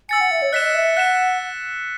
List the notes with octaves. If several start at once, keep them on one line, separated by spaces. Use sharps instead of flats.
G#5 E6 A6 C#7
F#5
E5
C#5
D#5 F#6 B6 E7
D#5
E5
F#5 F#6 B6 E7